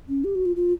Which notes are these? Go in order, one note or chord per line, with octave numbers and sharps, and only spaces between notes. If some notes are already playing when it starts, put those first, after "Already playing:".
C#4
G4
F#4
F4
F4